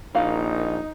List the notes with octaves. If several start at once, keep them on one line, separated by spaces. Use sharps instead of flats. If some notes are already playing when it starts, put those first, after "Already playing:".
A#1 A#3 D#4 F#4 F5